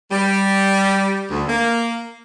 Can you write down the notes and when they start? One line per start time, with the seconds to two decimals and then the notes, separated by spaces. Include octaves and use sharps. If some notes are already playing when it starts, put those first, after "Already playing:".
0.12 G3
1.30 D2
1.49 A#3